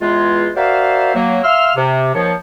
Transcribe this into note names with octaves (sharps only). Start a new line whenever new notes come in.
E2 G#3 F4
F#4 A#4 C5 D5 E5 F5
F#3 A#3
E5 F5 C6 E6 F6
C3
D#2 F3 C#5